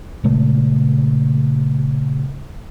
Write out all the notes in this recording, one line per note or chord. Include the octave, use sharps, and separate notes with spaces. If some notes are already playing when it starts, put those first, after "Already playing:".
A#2 C#3 G#3 A3